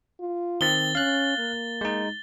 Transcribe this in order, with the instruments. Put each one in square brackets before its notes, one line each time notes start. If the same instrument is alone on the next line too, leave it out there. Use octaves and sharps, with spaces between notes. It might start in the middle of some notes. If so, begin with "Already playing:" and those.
[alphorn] F4
[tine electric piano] D#3 C4 [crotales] A6 G7
[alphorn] C#4 [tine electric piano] F5 F#6
[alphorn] A#3
[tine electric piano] G#3 D#4